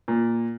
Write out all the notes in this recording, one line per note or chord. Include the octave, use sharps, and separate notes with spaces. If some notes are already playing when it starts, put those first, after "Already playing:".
A#2